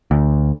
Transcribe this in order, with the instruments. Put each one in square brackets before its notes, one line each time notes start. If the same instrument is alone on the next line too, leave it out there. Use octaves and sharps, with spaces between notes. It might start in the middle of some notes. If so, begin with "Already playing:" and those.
[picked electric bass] D2